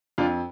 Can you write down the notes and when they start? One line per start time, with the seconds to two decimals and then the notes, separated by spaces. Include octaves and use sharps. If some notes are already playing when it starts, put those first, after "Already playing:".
0.18 F2 D4 F4